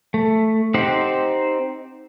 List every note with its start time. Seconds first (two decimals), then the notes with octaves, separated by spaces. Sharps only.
0.14 A3
0.74 C4 D#4 G4 C5 F#5